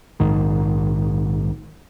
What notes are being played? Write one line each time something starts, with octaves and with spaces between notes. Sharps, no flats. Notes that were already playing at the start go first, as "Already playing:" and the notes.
A#1 G#2 D#3